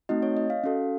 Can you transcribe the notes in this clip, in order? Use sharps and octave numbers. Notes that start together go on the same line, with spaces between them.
A3 C4 D#4 F#4 D#5
C#5
D#5
F5
C#4 F#4 A4